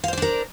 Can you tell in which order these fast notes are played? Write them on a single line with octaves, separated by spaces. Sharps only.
F5 C5 D5 D4 A#4